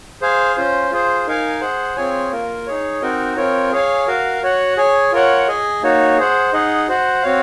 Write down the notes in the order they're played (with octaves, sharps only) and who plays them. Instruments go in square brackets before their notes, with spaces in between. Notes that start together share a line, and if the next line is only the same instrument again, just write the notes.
[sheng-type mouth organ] G#4 C5 F5 G#5
C#4 F4 C5
F4 G#4 C5
D#4 A#4 F5 G#5
G#4 C5 F#5
C4 F4 G#4 C#5 G#5
A#3 F4 A#4
D#4 G#4 C#5
C4 D#4 F#4 A#4 D#5
C4 F4 A#4 C#5
G#4 C#5 F5 G#5
F#4 A#4 F5
F#4 C#5 F#5
G#4 C#5 G#5
F4 A#4 C#5 F#5
G#4 D#5 G#5
A#3 D#4 F#4 C#5
G#4 C5 F#5
D#4 G#4 D#5 F#5
F#4 C5 F#5
C4 F#4 C#5 F5